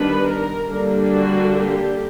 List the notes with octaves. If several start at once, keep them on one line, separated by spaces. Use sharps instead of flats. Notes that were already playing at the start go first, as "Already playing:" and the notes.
Already playing: D#3 G3 B3 D4 B4
A#4
D3 G3 A#3 D4
F#4
G4